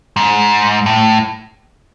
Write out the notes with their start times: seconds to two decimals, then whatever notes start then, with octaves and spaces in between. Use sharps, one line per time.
0.16 G#2
0.86 A2